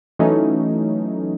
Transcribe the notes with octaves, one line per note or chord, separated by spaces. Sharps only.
E3 F#3 A3 C#4 D#4